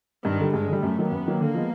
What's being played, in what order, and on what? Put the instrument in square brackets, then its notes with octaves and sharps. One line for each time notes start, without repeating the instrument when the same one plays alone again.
[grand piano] G2 [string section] D#3
[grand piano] D3 G3
[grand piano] G2 [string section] G#3
[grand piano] D3 G3
[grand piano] F#2 [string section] A3
[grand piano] D#3 F#3 A#3
[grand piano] F#2 [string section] B3
[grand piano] D#3 F#3 A#3
[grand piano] D3 [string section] A#3
[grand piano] F3 G#3 B3